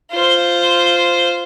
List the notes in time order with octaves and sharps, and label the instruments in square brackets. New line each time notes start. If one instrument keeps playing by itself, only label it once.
[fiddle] F4 C5